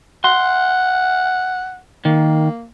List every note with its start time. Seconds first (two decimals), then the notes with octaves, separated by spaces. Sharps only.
0.24 F#5 C6
2.05 D#3 A#3